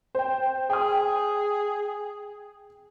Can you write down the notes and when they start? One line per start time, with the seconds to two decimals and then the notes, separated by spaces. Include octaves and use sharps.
0.15 C5 G5
0.70 G#4 G5 D#6